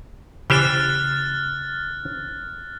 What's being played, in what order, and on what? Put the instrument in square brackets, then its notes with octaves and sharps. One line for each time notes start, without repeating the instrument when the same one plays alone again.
[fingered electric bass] C#3 [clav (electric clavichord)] E3 G4 C5 [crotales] F6 F#6 A6